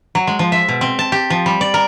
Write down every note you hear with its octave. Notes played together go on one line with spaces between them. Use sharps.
F#3
G#3
F3
E5
B2
C4
A5
G4
F3
G3
D5
A#4